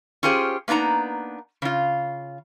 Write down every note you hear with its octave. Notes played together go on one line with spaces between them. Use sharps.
C#4 F4 G4 G#4 C5
A#3 B3 D4 D#4 A#5
C#3 F4